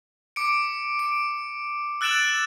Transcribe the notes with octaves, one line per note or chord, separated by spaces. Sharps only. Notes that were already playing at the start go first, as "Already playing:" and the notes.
D6 C#7 D7
D7
E6 F#6 A6 D7 E7 F#7